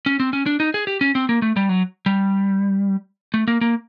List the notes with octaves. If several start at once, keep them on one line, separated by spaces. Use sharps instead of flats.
C#4
C4
C#4
D4
D#4
G#4
G4
C#4
C4
A#3
A3
G3
F#3
G3
A3
A#3
A#3